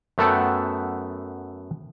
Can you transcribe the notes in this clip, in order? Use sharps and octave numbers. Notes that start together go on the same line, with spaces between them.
F#2 A3 B3 A4 F#5 G5